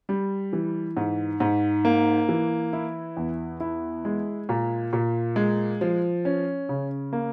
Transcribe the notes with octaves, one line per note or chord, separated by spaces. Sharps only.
G3
E3
G#2
G#2
A#3
E3
E4
E2
E4
G#3
A#2
A#2
G#3
F3
C#4
C#3
A#3